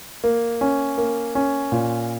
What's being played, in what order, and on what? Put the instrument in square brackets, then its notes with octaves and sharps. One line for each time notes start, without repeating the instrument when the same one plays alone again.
[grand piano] A#3
C#4
A#3
C#4
A#2